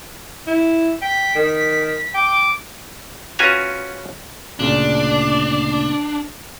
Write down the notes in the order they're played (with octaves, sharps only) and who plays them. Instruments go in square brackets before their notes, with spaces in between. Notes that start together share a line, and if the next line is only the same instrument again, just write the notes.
[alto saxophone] E4
[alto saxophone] G5 [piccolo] B6
[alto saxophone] D#3
[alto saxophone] G5 [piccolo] D6
[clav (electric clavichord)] C#4 F4 F#4 B4 G#5 A#5
[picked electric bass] D2 A#2 C#3 [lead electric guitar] D4